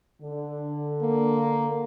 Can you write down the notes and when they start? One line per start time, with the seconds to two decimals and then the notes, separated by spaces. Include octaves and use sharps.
0.22 D3
1.02 A#3